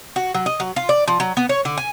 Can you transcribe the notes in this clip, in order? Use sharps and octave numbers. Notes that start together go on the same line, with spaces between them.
F#4
F#3
D#5
F#3
F4
D5
F3
F#3
B3
C#5
D3
G#5